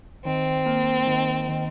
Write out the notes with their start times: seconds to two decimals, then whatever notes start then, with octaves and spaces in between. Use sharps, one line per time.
0.25 D#3 C4
0.66 A#3
1.06 D#3
1.48 D#3